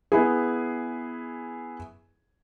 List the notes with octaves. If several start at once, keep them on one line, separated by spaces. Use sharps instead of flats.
B3 E4 G#4